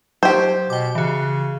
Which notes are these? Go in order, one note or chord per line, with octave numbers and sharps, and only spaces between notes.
F#3 G4 C5
B2 G5 D6
C#3 E3 F#4